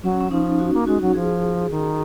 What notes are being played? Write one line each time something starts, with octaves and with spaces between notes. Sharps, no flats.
F#3 C#4
C#4
F3 D#4
F#4
A#3
G#3 F#4
F#3
F3 G#4
D#3